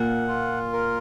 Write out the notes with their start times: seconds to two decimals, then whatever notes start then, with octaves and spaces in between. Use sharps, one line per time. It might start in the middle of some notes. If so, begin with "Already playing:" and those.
Already playing: A#2 A#3 F#5
0.28 F4
0.73 A#4